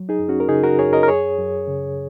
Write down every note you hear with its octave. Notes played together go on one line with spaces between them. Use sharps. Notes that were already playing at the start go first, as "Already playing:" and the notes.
Already playing: F#3
D#4 G#4
F#2
C#4 F#4
A#4
C#3 D#4 G#4
F#4 A#4
F#2 G#4 C#5
A#4 D#5
A#4
F#2 G#4 C#5
F#2
C#3